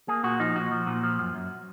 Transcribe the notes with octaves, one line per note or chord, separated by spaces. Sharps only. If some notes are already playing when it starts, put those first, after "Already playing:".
A#3 G#4
A#2 F#4
F3 D#4
A#2 F#4
F3
A#2
F3
F#2
F#2